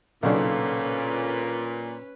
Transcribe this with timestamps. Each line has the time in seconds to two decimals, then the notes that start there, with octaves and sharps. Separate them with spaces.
0.23 B1 A#2 C#3 C#4 D4 A4 B4 F5